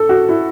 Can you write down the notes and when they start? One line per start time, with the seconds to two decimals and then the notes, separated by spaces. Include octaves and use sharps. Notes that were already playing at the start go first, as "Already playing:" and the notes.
Already playing: A4
0.09 F#4
0.29 E4